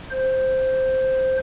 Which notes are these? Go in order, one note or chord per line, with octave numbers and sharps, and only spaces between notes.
C5